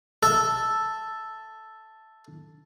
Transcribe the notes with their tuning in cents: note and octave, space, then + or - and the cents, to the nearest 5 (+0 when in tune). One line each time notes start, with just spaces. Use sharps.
A4 +0 E5 +0